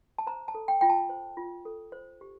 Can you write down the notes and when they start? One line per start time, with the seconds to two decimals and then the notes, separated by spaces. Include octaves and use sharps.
0.18 A5
0.27 C5 A#5
0.48 A5
0.55 A4
0.68 G5
0.81 F4 G5
0.90 A5
1.09 C5
1.37 F4
1.65 A4
1.92 C5
2.21 G4